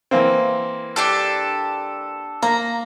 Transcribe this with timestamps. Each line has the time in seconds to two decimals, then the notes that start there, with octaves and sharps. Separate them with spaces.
0.11 E3 A#3 C4
0.96 D4 G4 A4
2.43 A#3 A#5